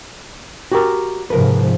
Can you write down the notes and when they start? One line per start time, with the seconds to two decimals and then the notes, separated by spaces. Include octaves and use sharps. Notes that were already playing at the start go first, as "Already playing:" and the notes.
0.72 F#4 G4 A#4
1.30 G#2 C3 F3 A#4 B4